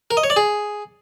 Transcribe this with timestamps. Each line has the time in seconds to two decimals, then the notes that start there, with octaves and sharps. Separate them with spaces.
0.11 A#4
0.17 D#5
0.24 C#5
0.30 D5
0.36 G#4